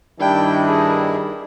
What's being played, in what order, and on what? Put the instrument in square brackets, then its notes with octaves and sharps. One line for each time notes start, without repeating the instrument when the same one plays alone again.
[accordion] G2 D4 E4 [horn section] D#3 G3 [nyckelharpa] G5
[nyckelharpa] G#4